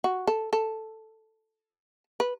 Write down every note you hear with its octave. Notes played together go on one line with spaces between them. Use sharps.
F#4
A4
A4
B4